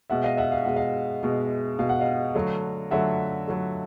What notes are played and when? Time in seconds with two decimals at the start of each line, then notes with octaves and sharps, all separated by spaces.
0.10 B2 G#3 E5 F#5
0.24 D#5 F5
0.37 E5 F#5
0.52 F5
0.65 B2 G#3 F#5
0.76 D#5 F5
1.23 B2 G#3
1.79 B2 G#3 F5
1.89 F#5
2.00 D#5 F5
2.35 D3 F#3 A3
2.91 D3 F#3 A3 E5 F#5
3.47 D3 F#3 A3